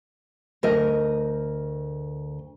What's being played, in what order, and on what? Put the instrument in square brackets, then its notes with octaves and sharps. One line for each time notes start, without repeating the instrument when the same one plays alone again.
[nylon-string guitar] D2 A#4 D#5